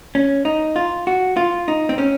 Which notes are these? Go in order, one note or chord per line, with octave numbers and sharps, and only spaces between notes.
C#4
D#4
F4
F#4
F4
D#4
C4
C#4